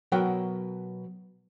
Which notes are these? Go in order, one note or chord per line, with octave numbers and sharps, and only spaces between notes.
B2 F#3 A#4 B4 F#5 G5